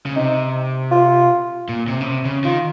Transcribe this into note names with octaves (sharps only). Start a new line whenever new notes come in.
C#3
C3 D#4
F4
A#2
C3
C#3
C3
C#3
D#3 F4